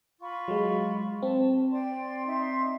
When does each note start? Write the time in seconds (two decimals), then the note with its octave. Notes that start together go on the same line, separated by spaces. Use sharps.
0.20 F4 B5 C#6
0.48 F#3 G#3
1.22 C4 A5
1.71 D5 G5 C6
2.26 D#4 E5 C6